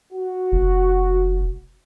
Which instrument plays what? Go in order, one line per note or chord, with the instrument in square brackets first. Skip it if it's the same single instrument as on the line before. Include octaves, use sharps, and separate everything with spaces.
[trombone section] F#4
[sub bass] F1